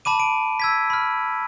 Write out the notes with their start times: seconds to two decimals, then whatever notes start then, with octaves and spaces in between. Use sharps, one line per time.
0.05 A5 B5 D6 D#7
0.19 D7 D#7
0.60 E6 G#6 B6
0.90 B5 F6